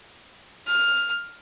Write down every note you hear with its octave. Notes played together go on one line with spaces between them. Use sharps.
F6